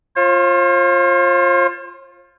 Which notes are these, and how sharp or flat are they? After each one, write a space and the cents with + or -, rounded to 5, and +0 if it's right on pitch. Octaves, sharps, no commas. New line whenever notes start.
F4 +0 C5 +45